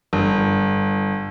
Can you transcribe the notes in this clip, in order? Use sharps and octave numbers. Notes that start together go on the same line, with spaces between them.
G1